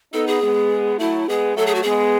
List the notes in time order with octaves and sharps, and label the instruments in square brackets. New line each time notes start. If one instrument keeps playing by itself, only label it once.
[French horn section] B3 D#4 [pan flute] A4
[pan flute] G#4
[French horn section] G#3 B3
[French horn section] F#3 A3 [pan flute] E4
[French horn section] G#3 B3 [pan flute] G#4
[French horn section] F#3 A3 [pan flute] A4
[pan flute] G#4
F#4
[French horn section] G#3 B3 [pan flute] G#4